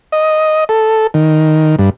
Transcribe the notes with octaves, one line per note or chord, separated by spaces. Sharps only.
D#5
A4
D#3
G2